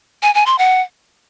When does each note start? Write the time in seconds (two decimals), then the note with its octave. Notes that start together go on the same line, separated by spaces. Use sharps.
0.23 G#5
0.34 G#5
0.46 C6
0.58 F#5